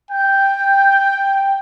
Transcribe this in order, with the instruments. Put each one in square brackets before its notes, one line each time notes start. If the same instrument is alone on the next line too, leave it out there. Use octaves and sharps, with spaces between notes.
[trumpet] G5 [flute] G6